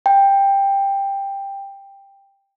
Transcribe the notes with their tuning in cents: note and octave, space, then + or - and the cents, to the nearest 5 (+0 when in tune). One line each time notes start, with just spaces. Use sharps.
G5 +10